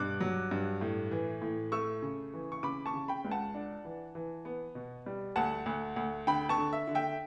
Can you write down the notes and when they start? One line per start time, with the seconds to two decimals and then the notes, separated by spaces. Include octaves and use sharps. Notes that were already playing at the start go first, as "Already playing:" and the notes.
Already playing: G2 B2 D6 F#6
0.20 F#3
0.51 G2
0.81 A2
1.11 E3
1.42 A2
1.72 A3 C#6 E6
2.02 C#3
2.34 E3
2.52 C#6
2.63 C#3 B5 D6
2.86 A5 C#6
2.94 C#3
3.08 G5 B5
3.25 C#2
3.31 F#5 A5
3.54 D4
3.85 E3
4.15 E3
4.45 B3
4.75 B2
5.06 G3
5.36 D2 F#5 A5
5.66 D2
5.96 D2
6.27 D3 G5 B5
6.49 A5 C#6
6.58 D3
6.73 E5
6.87 D3
6.95 E5 G5